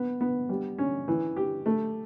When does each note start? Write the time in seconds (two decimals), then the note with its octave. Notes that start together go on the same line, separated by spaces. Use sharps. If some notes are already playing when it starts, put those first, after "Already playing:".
Already playing: B3
0.21 B3
0.49 G3
0.78 C#4
1.08 E3
1.36 G4
1.66 A3